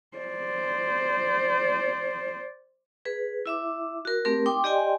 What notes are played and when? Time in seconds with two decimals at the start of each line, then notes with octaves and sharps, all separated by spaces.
0.17 C5 D5
3.05 G#4 B4
3.46 E4 E5 D6
4.05 F#4 A#4
4.25 A3 C4 G4 A#4
4.46 D#4 G5 C6 D6
4.64 G4 D5 D#5 G5 G#5 C6